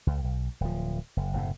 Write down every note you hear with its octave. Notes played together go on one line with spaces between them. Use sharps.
C#2
B1
D1 F3
F#1
F#1 A2 C3